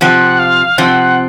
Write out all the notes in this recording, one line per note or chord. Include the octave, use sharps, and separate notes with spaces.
C3 F3 C4 F#5
F5
C3 F3 C4 F#5